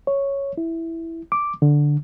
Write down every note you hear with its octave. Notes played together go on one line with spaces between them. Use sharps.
C#5
E4
D6
D3